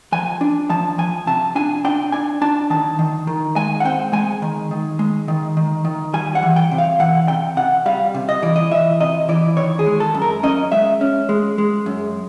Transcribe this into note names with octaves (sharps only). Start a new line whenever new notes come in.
F3 G#5
D4
F3 A5
F3 G#5
C3 A5
D4 G#5
D4 G5
D4 G#5
D4 A5
D#3 A5
D#3
D#3
G#3 G#5
F#5
C4 G5
G#3 G#5
D#3
D#3
G#3
D#3
D#3
D#3
G3 G#5
F#5
E3
G5
C3
F5
E3 F#5
C3 G5
C3 F#5
G3 F5
C3
D#5
E3 D5
D#5
E3 E5
C3 D#5
E3 D5
D#3 C#5
G#4
G#3
A4
F#2
A#4
C#4 D#5
G#3 E5
C#4
G#3
G#3
F#2